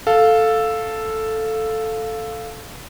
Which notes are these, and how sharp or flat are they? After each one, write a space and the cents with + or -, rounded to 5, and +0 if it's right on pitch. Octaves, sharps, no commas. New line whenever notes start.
A4 +0 F5 +0